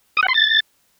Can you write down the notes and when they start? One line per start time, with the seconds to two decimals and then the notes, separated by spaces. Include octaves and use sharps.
0.17 D#6
0.23 F#5
0.28 C6
0.34 A6